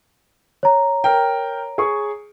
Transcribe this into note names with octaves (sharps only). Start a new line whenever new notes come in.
C#5 A#5
A#4 G5
G#4 C#6